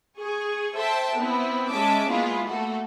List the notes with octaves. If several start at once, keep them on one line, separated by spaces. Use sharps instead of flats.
G#4 C#6
A4 C5 E5 G5 A5
B3 C4 E4
G#3 C#4 E5 A5 D6
G#3 A#3 B3 E4 F4 G#4
A3 A#3 F#4 A4